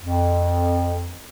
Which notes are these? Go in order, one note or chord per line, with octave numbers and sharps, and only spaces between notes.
F2